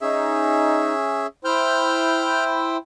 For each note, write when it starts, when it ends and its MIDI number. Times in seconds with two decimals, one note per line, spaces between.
0.01 1.27 61
0.01 0.93 63
0.01 1.27 68
0.01 1.27 76
1.45 2.77 64
1.45 2.77 72
1.45 2.77 79
1.45 2.44 89
1.45 2.44 91